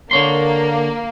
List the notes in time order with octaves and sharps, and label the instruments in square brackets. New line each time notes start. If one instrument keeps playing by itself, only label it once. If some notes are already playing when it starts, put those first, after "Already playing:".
[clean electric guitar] D3 C#5 C6 [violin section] A#3